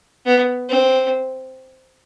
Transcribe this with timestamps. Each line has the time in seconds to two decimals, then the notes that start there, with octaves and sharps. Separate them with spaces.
0.26 B3
0.69 C4